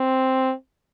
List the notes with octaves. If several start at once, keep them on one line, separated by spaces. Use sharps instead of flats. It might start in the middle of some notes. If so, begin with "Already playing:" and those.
Already playing: C4